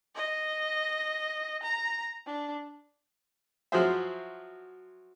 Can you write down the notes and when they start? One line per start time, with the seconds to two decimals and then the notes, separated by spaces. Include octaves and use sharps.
0.16 D#5
1.63 A#5
2.26 D4
3.72 F3 F#3 F#4 G#4 C5 E5